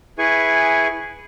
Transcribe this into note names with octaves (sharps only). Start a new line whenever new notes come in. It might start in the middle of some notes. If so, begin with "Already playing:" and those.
E4 G#4 B4 G#5 C#6